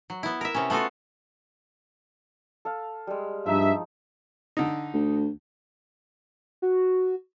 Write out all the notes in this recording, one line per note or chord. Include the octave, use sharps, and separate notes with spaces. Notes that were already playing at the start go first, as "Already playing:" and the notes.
F#3
B3 E4
A#4 E5
C3 B3 C#4
A3 B3 F4 F#4 A4
A4 F5
G3 G#3
G2 F3 D#4 E5
D3 D#4
D2
F#4